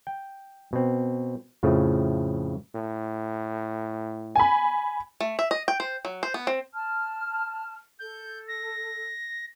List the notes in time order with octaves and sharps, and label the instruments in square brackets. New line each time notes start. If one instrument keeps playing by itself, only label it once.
[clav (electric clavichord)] G5
B2 C4
F2 A2 C#3 F3 A3
[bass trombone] A2
[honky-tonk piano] G#5 B5
[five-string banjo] A3
E5
D#5
G5
C5
F#3
C5
B3
C4
[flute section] A5 F6
[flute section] A4 [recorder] G6
[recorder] A#6